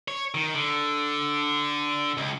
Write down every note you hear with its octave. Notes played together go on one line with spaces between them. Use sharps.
C#5
D#3
D3
C#2